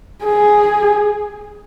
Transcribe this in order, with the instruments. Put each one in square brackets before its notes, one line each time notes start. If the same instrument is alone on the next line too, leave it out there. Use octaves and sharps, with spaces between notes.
[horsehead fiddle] G#4